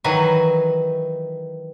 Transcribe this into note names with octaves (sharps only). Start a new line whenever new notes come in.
D#3 E3 F#3 D#4 B4 G#5